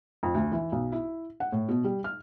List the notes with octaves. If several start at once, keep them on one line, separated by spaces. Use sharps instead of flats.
F2
D2
E3
B1
E4
F#5
A2
B2
G3
F6